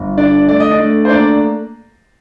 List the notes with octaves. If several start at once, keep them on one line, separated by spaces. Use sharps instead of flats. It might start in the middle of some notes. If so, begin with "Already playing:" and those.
Already playing: G1
D3 D4 D5
A3 D5
D#5
D4 D5
A3
C5
A#3 D4 D5